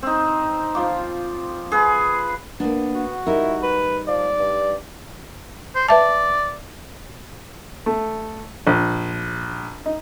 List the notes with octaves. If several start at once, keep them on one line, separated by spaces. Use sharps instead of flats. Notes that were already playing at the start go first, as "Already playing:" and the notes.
C4 D#4
F3 F4 D6
G#4 B4
A#3 B3 D4
F#4
G3 D#4 E4 A#4
B4
F3 D5
G2
C5
B4 D5 E5 A5
A3
A#1
D#4